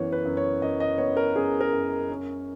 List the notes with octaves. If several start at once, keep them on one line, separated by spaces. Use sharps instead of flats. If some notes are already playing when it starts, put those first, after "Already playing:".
Already playing: F#2 E3 B3 C#5
B4
F#2
C#5
F#2 D#5
D#5
B3 C#5
A#4
F#2 G#4
A#4
F#2
C#4